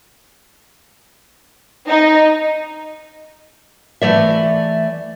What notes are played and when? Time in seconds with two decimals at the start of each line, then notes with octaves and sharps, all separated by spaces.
1.88 D#4
4.02 E3 A3 D5 E5